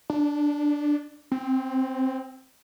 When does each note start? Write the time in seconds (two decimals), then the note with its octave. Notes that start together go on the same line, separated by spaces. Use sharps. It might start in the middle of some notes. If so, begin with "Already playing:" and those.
0.10 D4
1.32 C4